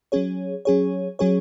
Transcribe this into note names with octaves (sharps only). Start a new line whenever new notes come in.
F#3 C#4 G#4 C#5
F#3 C#4 G#4 C#5
F#3 C#4 G#4 C#5